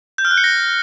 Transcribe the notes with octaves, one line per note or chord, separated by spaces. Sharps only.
G6
F6
F#6
C#7
A#6